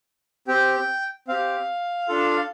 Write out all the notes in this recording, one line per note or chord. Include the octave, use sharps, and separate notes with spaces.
C4 G4 G5
C4 G4 F5
D4 F4 A4